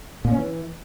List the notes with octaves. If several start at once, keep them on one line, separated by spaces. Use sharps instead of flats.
A#2
C#4
E3